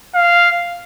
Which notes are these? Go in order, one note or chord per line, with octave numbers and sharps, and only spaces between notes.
F5